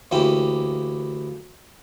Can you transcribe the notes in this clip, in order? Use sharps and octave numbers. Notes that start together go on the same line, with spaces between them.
D2 E3 A#3 C#4 E4 G4